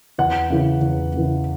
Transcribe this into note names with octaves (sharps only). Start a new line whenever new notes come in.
E2 F#5
C#3 E3
E2
C#3 E3